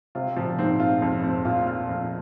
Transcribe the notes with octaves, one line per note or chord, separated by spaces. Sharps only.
C3 F4
A#2 F3
G#2 C4
F4
F2
C4
A#2 F4
F4
F2